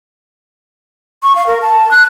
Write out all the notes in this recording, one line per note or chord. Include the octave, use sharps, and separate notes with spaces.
C#6
F5
A#4
A5
F#6